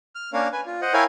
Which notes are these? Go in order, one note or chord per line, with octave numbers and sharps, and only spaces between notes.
F6
A#3 C#4 D4 A#4 C#5 F5
B4 G#5
F4
C5 D#5 F#5
E4 A#4 C#5 F5 G5 G#5